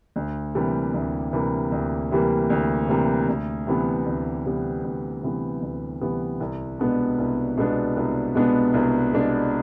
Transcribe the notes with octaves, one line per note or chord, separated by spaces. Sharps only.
D2
C3 E3 G3 A#3
D2
C3 E3 G3 A#3
D2
C3 E3 G3 A#3
D2
C3 E3 G3 A#3
D2
C3 E3 G3 B3
D2
C3 E3 G3 B3
D2
C3 E3 G3 B3
D2
C3 E3 G3 B3
C2
B2 G#3 B3 D4
C2
B2 G#3 B3 D4
C2
B2 G#3 B3 D4
C2
B2 G#3 B3 D4